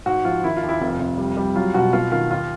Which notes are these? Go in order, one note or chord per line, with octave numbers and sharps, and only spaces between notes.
G#2 F#4
F3 F4
D#3 E4
F4
D#2
E4
F1 F4
F1
G3
G3
F#3 F4
B2 F#4
B3 F4
D#3 F4
D#2 F4